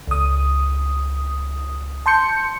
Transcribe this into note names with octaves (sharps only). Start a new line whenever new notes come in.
C#2 D#6
A5 C6 G6 C#7